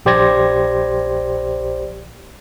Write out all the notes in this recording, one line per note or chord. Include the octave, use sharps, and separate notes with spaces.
A#1 G4 C5 D5 G#6 A#6